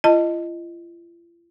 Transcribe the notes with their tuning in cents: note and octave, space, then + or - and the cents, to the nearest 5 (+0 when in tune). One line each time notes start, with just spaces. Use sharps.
F4 -45 D#5 +0 A5 +15